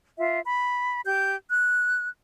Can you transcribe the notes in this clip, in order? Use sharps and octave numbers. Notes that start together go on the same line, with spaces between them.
F4 E5
B5
G4 G6
F#6